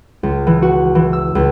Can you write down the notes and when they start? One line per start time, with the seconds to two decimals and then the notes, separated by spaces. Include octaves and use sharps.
0.23 C#2
0.47 E3
0.62 F#4
0.95 E3
1.13 E6
1.35 C#2